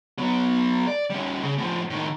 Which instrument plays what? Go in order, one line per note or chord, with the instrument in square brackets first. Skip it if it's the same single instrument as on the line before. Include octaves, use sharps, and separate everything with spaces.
[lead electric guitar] F#3 B3
D5
G3 C#4
C#3
A2 F3
A2 D#3